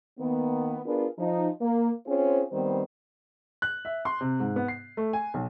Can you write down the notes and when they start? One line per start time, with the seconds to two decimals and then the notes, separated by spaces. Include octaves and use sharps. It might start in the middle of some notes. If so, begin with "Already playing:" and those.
0.20 D#3 A#3 B3
0.86 B3 D4 F4 G#4 A#4
1.19 F3 D#4
1.61 A#3
2.07 C4 C#4 F4 G#4 C5
2.52 D#3 G3 B3 C4 C5
3.62 F#6
3.85 E5
4.05 C6
4.21 C3
4.40 G#2
4.56 B3
4.68 C7
4.97 A3
5.13 G#5
5.34 B1